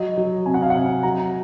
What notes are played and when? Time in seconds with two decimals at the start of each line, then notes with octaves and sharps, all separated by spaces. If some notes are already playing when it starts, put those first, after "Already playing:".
Already playing: F#3 D#5
0.17 F#3
0.46 C3 G#5
0.54 F#5
0.63 F5
0.70 C3 F#5
1.03 F#3 A#5